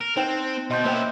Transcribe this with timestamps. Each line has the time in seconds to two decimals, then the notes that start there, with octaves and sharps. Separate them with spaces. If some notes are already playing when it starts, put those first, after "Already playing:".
0.01 A#4
0.16 C4 D#4 C5 G5
0.71 B2 D#5 C6 G6
0.85 A#3 C#4 C5 E5 G5